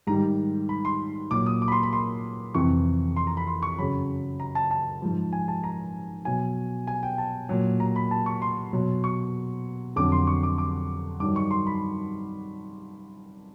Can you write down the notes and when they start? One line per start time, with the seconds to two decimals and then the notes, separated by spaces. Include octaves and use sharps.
0.07 G#2 D#3 G3 A#5
0.69 B5
0.85 C6
1.31 A#2 F#3 D6
1.46 D#6
1.62 D6
1.68 B5
1.72 C6
1.83 B5
1.93 C6
2.55 F2 C3 E3 C#6
3.16 C6
3.27 A#5
3.37 B5
3.47 C6
3.63 C#6
3.78 F#2 C#3 F#3 B5
4.40 A#5
4.55 A5
4.71 A5
5.02 G#2 F3
5.33 G#5
5.48 A5
5.64 A#5
6.25 B2 F#3 G#5
6.87 G#5
7.03 G5
7.18 A5
7.49 A#2 F#3
7.80 A#5
7.96 B5
8.11 A5
8.26 C#6
8.42 C6
8.73 B2 F#3
9.04 C#6
9.96 F2 D3 F#3 D6
10.12 C6
10.27 C#6
10.43 D6
10.58 D6
11.20 G2 D#3 F#3 D6
11.36 C#6
11.51 C6
11.67 B5